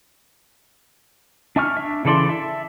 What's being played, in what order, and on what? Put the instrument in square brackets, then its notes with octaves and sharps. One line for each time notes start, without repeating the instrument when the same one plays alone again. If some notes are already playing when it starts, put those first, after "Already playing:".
[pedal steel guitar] D4 E5 G#5 C#6 F6
D4 E5
C#3 E3 A4 D5 C6
E5 A5